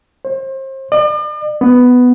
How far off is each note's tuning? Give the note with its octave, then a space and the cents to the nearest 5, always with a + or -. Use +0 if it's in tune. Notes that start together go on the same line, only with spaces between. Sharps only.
C5 +35
D5 +45
B3 +5